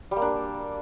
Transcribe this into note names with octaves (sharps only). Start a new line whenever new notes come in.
G3
A#3
D4